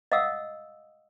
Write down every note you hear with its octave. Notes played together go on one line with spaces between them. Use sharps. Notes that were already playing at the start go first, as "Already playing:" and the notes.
D#5 F5 F#5 D#6 E6